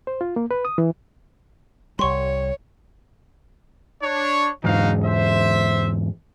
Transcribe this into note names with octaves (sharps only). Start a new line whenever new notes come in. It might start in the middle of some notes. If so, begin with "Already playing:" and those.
C5
F4
A#3
B4
D#6
E3
C2 G3 C#5 C6 C#6
D4 C#5
E2 G#2 D#4 F#4 F5
C5 E5